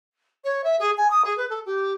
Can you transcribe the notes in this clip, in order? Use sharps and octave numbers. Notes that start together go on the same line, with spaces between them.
C#5
E5
G#4
G#5
D#6
G#4
B4
A4
G4